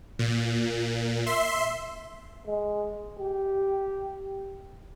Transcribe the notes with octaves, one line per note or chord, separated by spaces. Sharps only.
A#2
E5 C6
G#3
G4